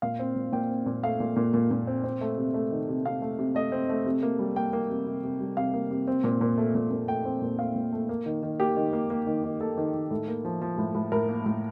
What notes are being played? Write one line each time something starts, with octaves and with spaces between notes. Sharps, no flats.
A#2 F5
C4
A#2
A#2 G5
C4
A#2
A3 F5
A#2
A#2
A#2
A#2
C4
C4
A3
C3
A3
D#3
C3
C3 F5
A3
C3
A3 D#5
C4
A3
C3
A#3
G3
A#3 G5
A#3
C3
C3
C3
G3
C3 F5
A#3
C3
C4
A#2
A#2
A3
A#2
A#2
A3 G5
C4
A#2
A3 F5
A#2
A3
A#3
D#3
D#3
A#3 G4
D#3
A#3
A#3
D#3
D#3
A#3 A4
D#3
D#3
A2 A4
A#3
F3
F3
A2
A2
A2 A#4
A#3
A2